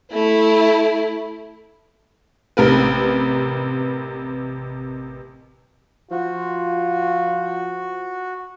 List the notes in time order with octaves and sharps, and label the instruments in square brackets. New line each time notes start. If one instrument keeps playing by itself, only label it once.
[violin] A3 E4
[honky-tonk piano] A1 C3 A#4 B4
[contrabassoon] F3 [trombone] F4 [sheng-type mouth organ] F#4